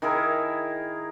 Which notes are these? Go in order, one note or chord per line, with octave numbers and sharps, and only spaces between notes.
D#3 E4 G#4 A#4